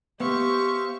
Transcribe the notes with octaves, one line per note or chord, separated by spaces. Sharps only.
B3 G4 C5 E5 F5 C#6